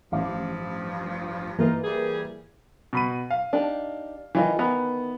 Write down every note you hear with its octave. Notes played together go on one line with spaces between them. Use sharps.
A1 G2 F3 F5 D6
E3 A#3 D#4 F4
G3 G#4
B2 B5 D#7
F5
D4 D#4 G4
D#3 E3 F4 D#5
D#3 E3 B3 A#5